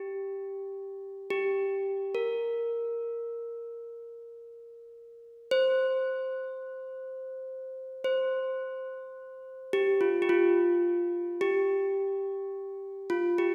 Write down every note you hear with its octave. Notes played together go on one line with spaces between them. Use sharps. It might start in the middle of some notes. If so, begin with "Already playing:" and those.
Already playing: G4
G4
A#4
C5
C5
G4
F4
G4
F4
G4
F4
G4